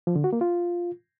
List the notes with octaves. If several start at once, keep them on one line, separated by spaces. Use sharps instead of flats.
F3
D3
F#4
A#3
F4